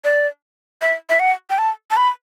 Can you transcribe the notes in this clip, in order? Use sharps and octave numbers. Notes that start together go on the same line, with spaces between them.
D5
E5
E5
F#5
G5
A5
A5
B5